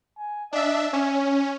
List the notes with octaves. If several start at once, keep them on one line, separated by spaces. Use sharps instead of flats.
G#5
D4 D#5 E5
C#4 G#5